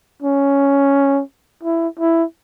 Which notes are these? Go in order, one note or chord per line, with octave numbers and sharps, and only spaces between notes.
C#4
E4
E4